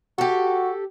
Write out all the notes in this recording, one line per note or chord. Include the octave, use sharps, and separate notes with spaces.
F#4 G4 A4